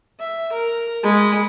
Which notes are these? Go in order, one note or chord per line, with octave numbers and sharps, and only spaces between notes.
E5
A#4
G#3 B5